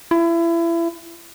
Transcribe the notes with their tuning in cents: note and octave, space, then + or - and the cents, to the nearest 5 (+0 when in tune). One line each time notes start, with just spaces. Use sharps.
E4 +30